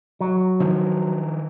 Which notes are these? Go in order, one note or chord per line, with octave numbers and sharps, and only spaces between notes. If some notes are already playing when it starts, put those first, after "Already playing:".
F#3
D#3 F3